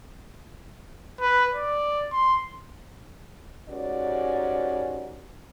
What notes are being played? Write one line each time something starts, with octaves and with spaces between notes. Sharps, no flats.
B4
D5
C6
G#2 C#4 F#4 G4 A#4 D5